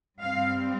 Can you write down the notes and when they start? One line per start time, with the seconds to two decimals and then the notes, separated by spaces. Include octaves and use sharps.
0.21 G2 G3 C4 F5